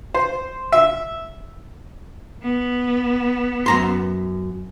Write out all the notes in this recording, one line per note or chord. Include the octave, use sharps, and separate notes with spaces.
C5
E5
B3
F#2 A#5 C6